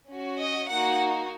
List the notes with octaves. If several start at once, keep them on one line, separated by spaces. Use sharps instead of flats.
C#4 F#4
D#5
A#3 D#4 F#4 F#5